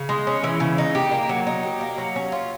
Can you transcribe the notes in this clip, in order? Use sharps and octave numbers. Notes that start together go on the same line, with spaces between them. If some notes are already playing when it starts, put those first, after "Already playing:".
Already playing: C#3
G#3
C#4
E3
C#3
D#4
G4
A#3
F#3
D#4
G4
A#3
F#3
C#4
F4